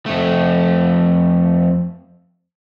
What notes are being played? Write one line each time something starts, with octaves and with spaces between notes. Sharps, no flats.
F2 A3